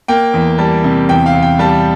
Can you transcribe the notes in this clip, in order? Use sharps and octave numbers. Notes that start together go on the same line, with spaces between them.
A#3 G5
E2
G3 A5
C3
E2 G5
F5
E2
G5
G3 A5